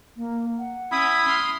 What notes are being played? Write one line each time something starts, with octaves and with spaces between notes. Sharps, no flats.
A#3
F#5
C#4 E4 B5 D#6
C6 F6